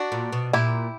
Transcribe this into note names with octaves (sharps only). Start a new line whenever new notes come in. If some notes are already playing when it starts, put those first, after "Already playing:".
Already playing: D4 F#4
A#2
B2
A#2 E4 G4